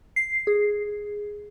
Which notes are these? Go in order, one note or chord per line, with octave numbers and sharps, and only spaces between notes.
C7
G#4